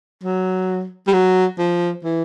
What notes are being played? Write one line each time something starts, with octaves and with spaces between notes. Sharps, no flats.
F#3
G3
F#3
F3
E3